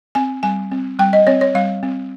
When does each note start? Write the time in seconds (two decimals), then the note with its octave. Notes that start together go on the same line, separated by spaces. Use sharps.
0.15 C4 G#5
0.43 G3 G#5
0.71 C4
0.99 G3 G5
1.13 D#5
1.27 C4 C#5
1.41 C#5
1.55 G3 F5
1.83 C4